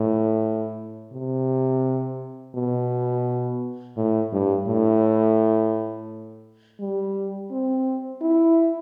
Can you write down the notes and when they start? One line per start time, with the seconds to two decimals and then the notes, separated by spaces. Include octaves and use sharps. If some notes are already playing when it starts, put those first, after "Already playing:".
Already playing: A2
1.13 C3
2.55 B2
3.97 A2
4.33 G2
4.68 A2
6.80 G3
7.51 C4
8.22 E4